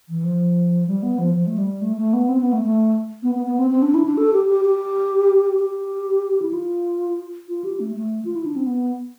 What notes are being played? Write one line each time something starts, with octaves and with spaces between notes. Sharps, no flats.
E3
F3
G3
B3
F3
F3
A3
G3
A3
A3
B3
C4
B3
A3
A3
B3
B3
B3
C4
C4
D4
E4
D4
A4
G4
G4
G4
G4
E4
F4
F4
G4
A3
A3
F4
E4
D4
C4
B3